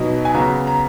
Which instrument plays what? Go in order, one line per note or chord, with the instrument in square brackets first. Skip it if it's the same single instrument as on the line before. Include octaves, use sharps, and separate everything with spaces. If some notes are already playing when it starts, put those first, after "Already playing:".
Already playing: [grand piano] B2 F#3 B3 D#4
G#5
C#3 F#3 B3 A#5
A#5